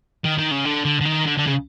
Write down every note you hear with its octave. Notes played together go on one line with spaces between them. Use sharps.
D#3
D#3
C#3
D3
D3
D3
D#3
D3
D3
C#3